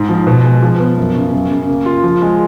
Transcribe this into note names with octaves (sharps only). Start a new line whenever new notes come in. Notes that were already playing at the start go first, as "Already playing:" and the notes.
Already playing: G#2
F3
B2
G#3
F3
B3
F#2
C#3
F#2
C#3
A#3
F4
F3
G#3